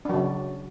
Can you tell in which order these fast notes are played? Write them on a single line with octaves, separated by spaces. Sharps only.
D4 F#3 C#3